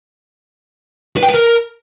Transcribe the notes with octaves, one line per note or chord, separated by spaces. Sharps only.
B4
G5
B4
A#4